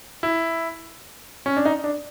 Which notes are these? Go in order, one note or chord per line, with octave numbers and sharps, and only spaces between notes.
E4
C#4
D4
D#4
D4